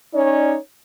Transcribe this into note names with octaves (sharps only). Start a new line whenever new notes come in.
C#4 D#4 C#5 D5